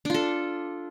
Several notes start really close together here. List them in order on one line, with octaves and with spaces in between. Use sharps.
D4 F4 A4